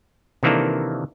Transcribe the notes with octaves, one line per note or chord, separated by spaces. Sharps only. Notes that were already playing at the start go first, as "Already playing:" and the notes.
C3 D#3 E3 A#3 D4 A4